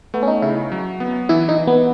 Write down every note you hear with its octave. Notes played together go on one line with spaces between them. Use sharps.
A3 B3
C#4
D#4
C#3 E4
F#3
B3
E3 E4
D#4
E3
B3